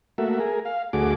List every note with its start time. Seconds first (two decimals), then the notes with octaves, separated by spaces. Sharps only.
0.18 A3 A#3 F#4 E5
0.40 G#4 A#4
0.65 F5
0.93 D2 A3 F#4 G#4 D6